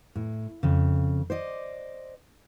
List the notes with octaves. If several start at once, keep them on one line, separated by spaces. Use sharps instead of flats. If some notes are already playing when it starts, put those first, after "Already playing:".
A2
F2 C#3
C5 D5 D#5